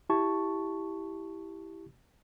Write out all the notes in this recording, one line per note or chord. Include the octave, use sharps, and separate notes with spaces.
E4 G4 A5 C#6